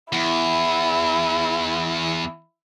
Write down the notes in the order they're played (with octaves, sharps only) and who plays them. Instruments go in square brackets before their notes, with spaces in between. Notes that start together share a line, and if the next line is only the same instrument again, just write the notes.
[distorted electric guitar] E2 [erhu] E4